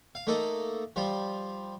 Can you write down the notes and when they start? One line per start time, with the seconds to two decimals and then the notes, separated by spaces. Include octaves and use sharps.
0.15 F5
0.27 A3 A#3 D#4 A4
0.96 F3 G3 F4